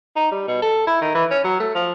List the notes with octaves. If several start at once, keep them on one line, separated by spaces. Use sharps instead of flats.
D#4
G3
B2
A4
E4
D#3
E3
C#4
F#3
A3
F3